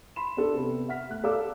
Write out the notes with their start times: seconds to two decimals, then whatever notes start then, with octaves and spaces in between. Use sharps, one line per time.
0.16 B5 C6 E7
0.37 D4 A4
0.54 C3 B3
0.88 E5 F#5 F6 B6
1.10 A3 F#6
1.24 A4 D5 F5 D6 E6